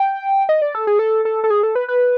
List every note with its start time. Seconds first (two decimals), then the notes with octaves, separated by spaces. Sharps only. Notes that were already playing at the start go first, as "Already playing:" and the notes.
Already playing: G5
0.49 D#5
0.62 D5
0.75 A4
0.87 G#4
0.99 A4
1.25 A4
1.44 A4
1.50 G#4
1.63 A4
1.75 B4
1.88 B4